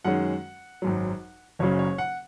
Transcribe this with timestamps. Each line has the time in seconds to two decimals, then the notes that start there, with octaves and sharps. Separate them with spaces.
0.05 F#2 D#3 G#3 C#4 F#5
0.82 G#1 F#2 F#3
1.59 F#1 F#2 C#3 F#3 C#4 C#5
1.79 C#5
1.98 F#5